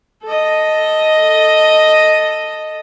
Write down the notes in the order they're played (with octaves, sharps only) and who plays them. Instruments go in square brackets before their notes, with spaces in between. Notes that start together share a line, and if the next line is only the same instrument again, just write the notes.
[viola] A4 D#5